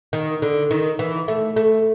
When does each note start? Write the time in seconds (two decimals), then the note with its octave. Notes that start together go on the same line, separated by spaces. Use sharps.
0.13 D#3
0.42 D3
0.71 D#3
0.99 E3
1.28 A3
1.56 A3